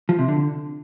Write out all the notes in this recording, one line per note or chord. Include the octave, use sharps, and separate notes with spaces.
F3
C3
D3